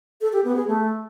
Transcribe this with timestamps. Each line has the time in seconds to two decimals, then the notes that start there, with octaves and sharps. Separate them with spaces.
0.21 A4
0.33 G4
0.44 B3
0.56 G#4
0.68 A3